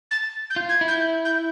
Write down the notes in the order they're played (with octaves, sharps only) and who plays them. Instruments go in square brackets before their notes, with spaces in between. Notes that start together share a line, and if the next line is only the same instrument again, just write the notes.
[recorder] A6
G6
[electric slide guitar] F4
[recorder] G#6
[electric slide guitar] E4
[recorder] G6
G6